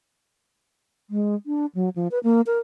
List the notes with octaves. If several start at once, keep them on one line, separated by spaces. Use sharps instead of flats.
G#3
D4
F#3
F3
B4
A#3
A#4